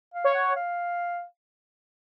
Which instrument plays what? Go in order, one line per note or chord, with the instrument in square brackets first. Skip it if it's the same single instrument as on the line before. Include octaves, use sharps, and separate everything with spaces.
[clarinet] F5
[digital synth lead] C#5
[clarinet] F#5
F5